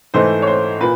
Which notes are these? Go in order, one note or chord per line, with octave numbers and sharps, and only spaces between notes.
G#2 E3 A3 C5
C#5
C5
A#2 B4